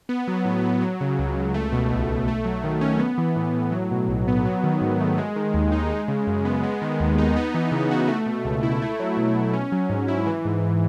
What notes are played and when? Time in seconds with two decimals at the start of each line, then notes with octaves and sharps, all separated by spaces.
0.09 B3
0.28 F#3
0.45 A2
0.64 A2
0.82 F#3
1.01 C#3
1.19 C#2
1.37 C#2
1.54 A3
1.72 B2
1.91 B1
2.09 B1
2.28 A3
2.45 F#3
2.64 D#3
2.81 C#4
2.99 B3
3.18 E3
3.36 A2
3.54 A2
3.72 F#3
3.91 B2
4.08 B1
4.28 B3
4.45 F#3
4.64 D#3
4.81 G#2
5.00 A3
5.18 G#3
5.36 D#3
5.54 D#2
5.72 D#4
5.91 G#3
6.08 C#3
6.27 F#2
6.45 B3
6.63 G#3
6.82 D#3
7.00 D#2
7.18 D#4
7.36 B3
7.54 E3
7.72 C#3
7.91 F#4
8.08 A3
8.26 B2
8.45 C#2
8.63 E4
8.82 A3
9.00 F#3
9.17 B2
9.36 B2
9.53 C#4
9.72 F#3
9.90 G#2
10.08 E4
10.27 E3
10.45 G#2